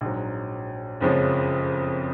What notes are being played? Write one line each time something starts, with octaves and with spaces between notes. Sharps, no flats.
A#1 G#2 F#3
F#1 F2 F3 G#3 C#4